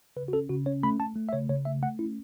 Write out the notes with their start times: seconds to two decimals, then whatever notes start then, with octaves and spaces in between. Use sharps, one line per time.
0.16 C#3 B4
0.28 F#4
0.33 C#4 A4
0.49 C#3 F#4
0.66 C#4 C#5
0.83 A3 B5
1.00 A3 A5
1.16 A3
1.29 E5
1.33 C#3 C#5
1.49 C#3 C#5
1.65 A3 E5
1.82 A3 F#5
1.99 C#4 E4